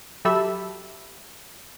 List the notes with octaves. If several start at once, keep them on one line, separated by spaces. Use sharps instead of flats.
F#3 G4 A4 E5 B5 E6